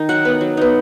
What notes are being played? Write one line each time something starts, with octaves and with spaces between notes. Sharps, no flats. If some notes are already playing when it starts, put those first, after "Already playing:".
Already playing: D#3 D#4
F#3 F#5
B3 D#4
F#3
B3 D#4